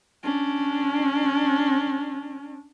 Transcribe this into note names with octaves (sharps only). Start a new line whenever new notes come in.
C#4 D4